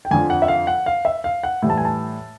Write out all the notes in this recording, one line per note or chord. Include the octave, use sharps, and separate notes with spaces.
G5
F2 D3 F3 G#5
F#5
E5
F5
F#5
F5
E5
F5
F#5
A2 E3 G3
A5
G#5
A5